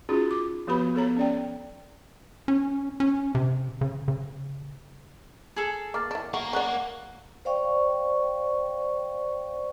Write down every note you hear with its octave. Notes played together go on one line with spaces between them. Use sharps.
C#4 D#4 F4 F#4 G#4
D6
F3 B3 F#4 G4 B4 B5
B3 A4 C#5 A#5
C#4 D5 G5
C#4
C#4
C3
C#3
C#3
G#4 A4
A#3 D6 F6 A6
E3 D4
A#3 F#4
C#4 D5 F#5 F#6
C5 D5 F5 G5 C#6